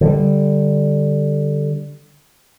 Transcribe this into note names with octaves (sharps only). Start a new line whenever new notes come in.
D3 G3